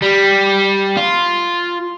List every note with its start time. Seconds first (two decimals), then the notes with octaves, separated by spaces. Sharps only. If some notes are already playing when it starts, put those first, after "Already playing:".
0.02 G3
0.97 F4